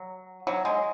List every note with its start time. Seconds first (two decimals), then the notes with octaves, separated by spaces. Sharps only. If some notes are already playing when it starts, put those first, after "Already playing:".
Already playing: F#3
0.47 F#3
0.65 G#3